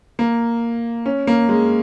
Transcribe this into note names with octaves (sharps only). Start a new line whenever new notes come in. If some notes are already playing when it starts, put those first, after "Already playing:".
A#3
C#4
A#3
G#3